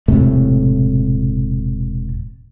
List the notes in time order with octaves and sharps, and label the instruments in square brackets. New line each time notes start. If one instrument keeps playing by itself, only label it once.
[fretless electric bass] E1 A2 C3 A3